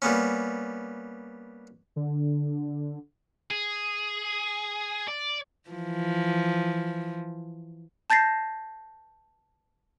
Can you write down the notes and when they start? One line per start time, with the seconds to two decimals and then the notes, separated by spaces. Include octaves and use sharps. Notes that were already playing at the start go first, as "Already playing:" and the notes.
0.02 G3 A#3 B3 C#4
1.96 D3
3.51 G#4
5.08 D5
5.69 E3 F3
8.10 A5 G6 A6 A#6 C7